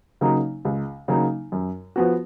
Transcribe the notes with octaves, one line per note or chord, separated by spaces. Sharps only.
C#3 F#3 A#3 D#4
C#2
C#3 F#3 A#3 D#4
F#2
F3 B3 F#4